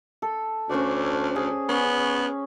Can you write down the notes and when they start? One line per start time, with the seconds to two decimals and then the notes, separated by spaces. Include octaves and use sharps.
0.22 A4
0.70 D2 C#4 C5 D5
1.36 G#4
1.69 B3 C#4